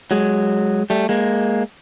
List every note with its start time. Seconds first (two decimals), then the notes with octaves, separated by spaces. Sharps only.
0.11 F#3 G#3
0.90 G3 A3
1.09 G#3 A#3